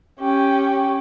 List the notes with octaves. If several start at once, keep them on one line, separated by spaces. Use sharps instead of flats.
C#4 G4